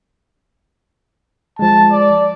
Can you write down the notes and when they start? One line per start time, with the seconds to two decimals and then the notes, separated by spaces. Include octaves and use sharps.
1.59 F3 G#3 A5
1.91 D5